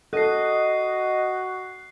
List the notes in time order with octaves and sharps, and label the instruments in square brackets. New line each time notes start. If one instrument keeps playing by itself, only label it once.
[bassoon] F#4 [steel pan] A4 [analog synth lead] D#5 [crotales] F#6 C7